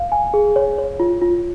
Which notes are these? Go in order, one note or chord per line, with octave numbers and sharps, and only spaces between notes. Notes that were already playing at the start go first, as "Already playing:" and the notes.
Already playing: F5
G#5
G#4
C#5
C#5
F4
F4